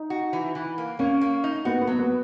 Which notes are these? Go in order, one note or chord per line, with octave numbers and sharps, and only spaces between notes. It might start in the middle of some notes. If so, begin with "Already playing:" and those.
Already playing: D#4
F#4
E3
E3
A#3
A#3 C#4
A#3
D#4
B3 F#4
B3
F#3
B3